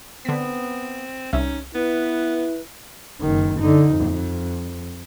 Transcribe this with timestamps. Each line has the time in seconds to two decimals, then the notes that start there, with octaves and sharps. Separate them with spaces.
0.25 D3 B3 C4 B6
1.33 C2 C#4 D#4 E5
1.75 B3 E4 B4
3.21 F#1 D#3
3.60 D3 D#4
3.95 F2